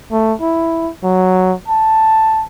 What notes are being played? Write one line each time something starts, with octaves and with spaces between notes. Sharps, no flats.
A3
E4
F#3
A5